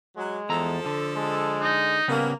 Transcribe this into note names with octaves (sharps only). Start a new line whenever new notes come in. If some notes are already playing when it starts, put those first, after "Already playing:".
F#3 G#3
E2 F3 A4 A#5
D3
G#3
D#4
C#3 G3 A#3 B3